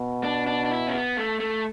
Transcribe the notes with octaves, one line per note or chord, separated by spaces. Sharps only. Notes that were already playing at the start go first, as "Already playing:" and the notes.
Already playing: B2
D4
D4
D4
E4
C#4
B3
A3
A3